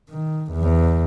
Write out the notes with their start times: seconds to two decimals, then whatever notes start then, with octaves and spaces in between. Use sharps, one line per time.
0.10 D#3
0.52 E2